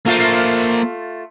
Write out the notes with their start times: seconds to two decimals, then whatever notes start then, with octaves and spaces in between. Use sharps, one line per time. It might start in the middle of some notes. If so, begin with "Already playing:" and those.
0.06 A3 A#3 F4 C5